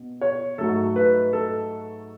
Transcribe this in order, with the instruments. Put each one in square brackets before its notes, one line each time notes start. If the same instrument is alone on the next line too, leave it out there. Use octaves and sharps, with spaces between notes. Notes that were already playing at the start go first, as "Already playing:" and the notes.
Already playing: [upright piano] B2
C#5
G#2 F#3 A3 A4
B4
A4